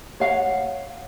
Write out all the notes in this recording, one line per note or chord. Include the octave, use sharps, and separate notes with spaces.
C#5 F5 F#5